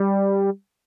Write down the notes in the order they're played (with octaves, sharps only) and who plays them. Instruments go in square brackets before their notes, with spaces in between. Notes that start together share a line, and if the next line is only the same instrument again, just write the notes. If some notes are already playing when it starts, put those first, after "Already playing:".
Already playing: [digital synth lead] G3